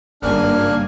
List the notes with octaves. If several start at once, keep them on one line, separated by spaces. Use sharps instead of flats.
G#1 G2 C#3 A#3 D4 G#5 F6 F#6